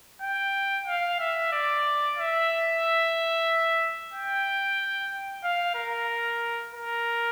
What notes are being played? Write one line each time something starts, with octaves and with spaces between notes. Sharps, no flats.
G5
F5
E5
D5
E5
G5
F5
A#4
A#4